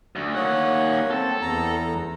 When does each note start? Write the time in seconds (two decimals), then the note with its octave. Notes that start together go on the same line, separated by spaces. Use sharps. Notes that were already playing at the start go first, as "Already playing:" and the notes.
0.16 D2
0.35 D#2 A#3 C#5 F#5
1.11 C4 A4 A5
1.41 E2 A#5